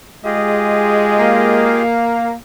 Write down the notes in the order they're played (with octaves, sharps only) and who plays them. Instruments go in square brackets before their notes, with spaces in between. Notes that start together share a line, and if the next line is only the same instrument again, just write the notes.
[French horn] G#3 [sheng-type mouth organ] F4 G4 G#4 [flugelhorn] D#5
[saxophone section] A#3